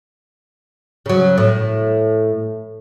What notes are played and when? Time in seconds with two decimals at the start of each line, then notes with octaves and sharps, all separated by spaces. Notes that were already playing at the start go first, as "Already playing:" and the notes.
1.06 C#3 F#3
1.38 A2